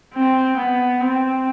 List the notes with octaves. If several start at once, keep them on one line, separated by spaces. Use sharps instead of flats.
C4
B3
C4